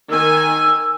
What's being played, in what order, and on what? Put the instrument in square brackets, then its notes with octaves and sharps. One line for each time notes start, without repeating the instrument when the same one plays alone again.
[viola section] D#3 G#5 [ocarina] E6